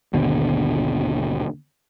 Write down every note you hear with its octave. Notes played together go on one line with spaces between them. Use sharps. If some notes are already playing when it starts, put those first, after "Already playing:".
G#1 D#2 B2 D3